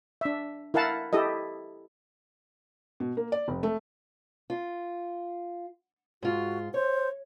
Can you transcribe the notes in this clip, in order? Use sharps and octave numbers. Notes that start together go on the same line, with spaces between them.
D4 E5
E4 A#4 F5 F#5 A5
E4 G4 A4 D#5
B2
A#3
D5
F1
A3
F4
G#2 F4 F#4
C5 C#5